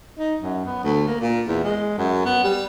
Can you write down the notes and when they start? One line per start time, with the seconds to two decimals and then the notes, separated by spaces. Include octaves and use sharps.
0.19 D#4
0.42 F#2
0.66 B3
0.84 D2
1.08 A#3
1.21 A#2
1.47 E2
1.64 G#3
1.98 F#2
2.25 B3
2.44 G3